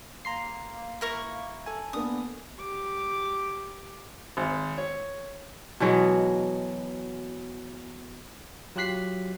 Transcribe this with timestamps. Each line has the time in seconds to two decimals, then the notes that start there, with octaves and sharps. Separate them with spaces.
0.25 A#3 A#5 C6 C7
1.01 E4 A#4 C#6
1.66 A4 G#5
1.93 A#3 B3 D4 D#6
2.59 G4 D6
4.37 G#1
4.78 C#5
5.80 B2 E3 F#3 G#3
8.76 F#3 F4 G4 F#6 B6 C7